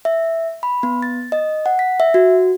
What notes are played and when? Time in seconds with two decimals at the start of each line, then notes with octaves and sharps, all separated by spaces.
0.05 E5
0.63 B5
0.83 B3
1.02 A6
1.32 D#5
1.66 F#5
1.79 B6
2.00 E5
2.14 F#4